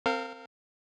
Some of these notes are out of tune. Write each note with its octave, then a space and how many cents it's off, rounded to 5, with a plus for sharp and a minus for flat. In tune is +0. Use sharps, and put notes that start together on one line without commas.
C4 +0 A#4 -35 F5 +0